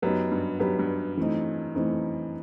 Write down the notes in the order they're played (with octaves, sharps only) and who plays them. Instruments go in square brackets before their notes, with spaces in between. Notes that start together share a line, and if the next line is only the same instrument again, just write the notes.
[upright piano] F#2 [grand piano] B3 D#4 G4 B4
[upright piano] G2
[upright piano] F#2 [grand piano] B3 D#4 G4 B4
[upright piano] G2
[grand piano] E3 A3 C4 D#4
E3 A3 C4 D#4